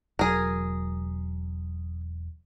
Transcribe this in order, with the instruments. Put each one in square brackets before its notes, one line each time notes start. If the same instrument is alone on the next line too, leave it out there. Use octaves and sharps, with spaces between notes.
[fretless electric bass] E1 F#3 [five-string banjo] G#4 A#4